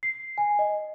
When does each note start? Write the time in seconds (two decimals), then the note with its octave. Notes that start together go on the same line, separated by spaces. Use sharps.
0.03 C7
0.38 G#5
0.59 D#5